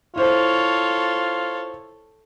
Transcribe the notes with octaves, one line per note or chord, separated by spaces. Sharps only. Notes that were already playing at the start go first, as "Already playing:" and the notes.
E4 F4 A4 C5 C#5